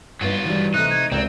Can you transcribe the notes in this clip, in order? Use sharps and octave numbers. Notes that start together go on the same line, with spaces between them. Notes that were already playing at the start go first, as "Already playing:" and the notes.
G2 F#3 B3 D#4 F4
D#3 E3 G3
C3 A3 D#4 F#6
G#6
C#2 C3 C4 A#4 D5